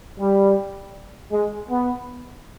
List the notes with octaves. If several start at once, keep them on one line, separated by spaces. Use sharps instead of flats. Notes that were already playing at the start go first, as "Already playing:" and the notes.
G3
G#3
B3